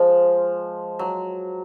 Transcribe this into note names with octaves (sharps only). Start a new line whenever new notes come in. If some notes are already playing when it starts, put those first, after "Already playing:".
Already playing: F3 G#3
F#3